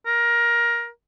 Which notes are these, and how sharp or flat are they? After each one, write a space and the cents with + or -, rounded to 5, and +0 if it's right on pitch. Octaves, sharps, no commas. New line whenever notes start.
A#4 +20